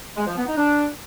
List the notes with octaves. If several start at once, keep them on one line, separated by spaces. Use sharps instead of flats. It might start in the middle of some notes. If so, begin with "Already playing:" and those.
G#3
F3
B3
D#4
D4